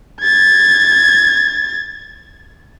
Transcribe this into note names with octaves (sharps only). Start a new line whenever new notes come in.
G#6 A6